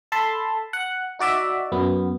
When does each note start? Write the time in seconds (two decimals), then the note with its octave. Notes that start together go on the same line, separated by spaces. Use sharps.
0.12 A4 A5 B5 C6
0.73 F#5
1.19 D#4 F#4 D5 E5
1.72 F#2 B3